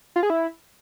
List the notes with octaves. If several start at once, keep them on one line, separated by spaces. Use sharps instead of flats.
F4
G#4
E4